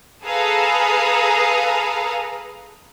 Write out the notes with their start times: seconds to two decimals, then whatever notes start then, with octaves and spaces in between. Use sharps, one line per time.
0.24 G#4 A4 B4 F5 A#5 D#6